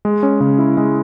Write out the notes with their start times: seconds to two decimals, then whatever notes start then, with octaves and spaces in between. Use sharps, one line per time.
0.05 G#3
0.23 C#4
0.41 C#3
0.58 E4
0.77 G#3